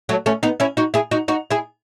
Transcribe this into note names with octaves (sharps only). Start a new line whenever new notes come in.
F#3 A3
A3 C#4
B3 D#4
C#4 E4
D#4 F#4
E4 G#4
D#4 F#4
D#4 F#4
E4 G#4